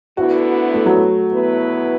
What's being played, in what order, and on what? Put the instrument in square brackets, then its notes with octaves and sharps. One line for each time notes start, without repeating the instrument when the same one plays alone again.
[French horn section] D2 D3 B3 E4 [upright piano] F#4
[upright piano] A3
F#3
A3
[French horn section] E2 B2 B3 E4 B4